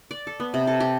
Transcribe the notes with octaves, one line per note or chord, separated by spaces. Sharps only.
D5
A4
B3
C3
A4
G4